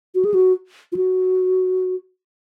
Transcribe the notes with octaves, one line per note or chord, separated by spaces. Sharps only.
F#4
G#4
F#4
F4
F#4